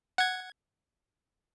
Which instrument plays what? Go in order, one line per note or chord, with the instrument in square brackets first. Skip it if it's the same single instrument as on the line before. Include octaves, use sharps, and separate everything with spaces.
[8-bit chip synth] F#5 G#6